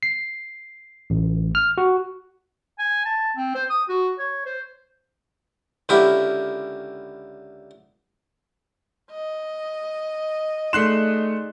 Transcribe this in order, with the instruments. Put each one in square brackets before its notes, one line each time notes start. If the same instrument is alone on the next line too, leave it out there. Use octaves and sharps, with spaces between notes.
[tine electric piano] C7
A1
F6
F#4
[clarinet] G#5
A5
C4
C5
D#6
F#4
C#5
C5
[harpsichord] C#2 D3 A#3 E4 G4 B5
[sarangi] D#5
[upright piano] A3 E7 [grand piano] D#4 G#4 D5 [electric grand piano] C6 F#6 C7